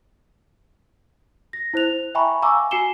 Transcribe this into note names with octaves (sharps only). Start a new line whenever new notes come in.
A#6
E4 C5 F#6 F7
E5 G5 G#5 A#5 B5 C#6
F5 G#5 A#5 C#6 D6 E6
F#4 G#5 C7 C#7 E7 G7